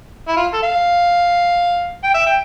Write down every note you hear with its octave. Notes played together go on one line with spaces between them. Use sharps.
E4
F4
A4
F5
G5
E5
G5